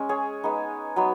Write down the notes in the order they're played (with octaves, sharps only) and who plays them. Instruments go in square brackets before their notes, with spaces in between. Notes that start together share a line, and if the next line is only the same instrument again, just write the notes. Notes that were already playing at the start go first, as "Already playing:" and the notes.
Already playing: [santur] G#3 C#4
G#4 C#5
G#3 B3 D#4
F#3 B3 D#4